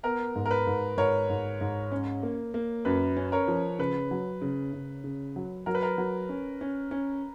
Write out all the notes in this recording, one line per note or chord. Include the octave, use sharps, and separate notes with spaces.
B3 A#4
G#2
A#4
B4
G#2
G#2 A#4 C#5
G#2
G#2
C#4
A#3
A#3
F#2 B4
C#4
A#4 C#5
F3
C#3 B4
F#3
C#3
C#3
C#3
F#3
F#3 A#4
B4
A#4
F#3
C#4
C#4
C#4